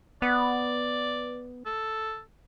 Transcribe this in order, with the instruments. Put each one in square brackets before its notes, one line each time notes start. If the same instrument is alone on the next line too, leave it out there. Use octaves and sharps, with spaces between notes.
[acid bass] B3 [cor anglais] D5
[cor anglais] A4